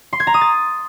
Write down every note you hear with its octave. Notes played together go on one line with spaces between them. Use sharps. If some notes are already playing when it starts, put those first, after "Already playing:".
C6
G#6
A#5
D#6
A6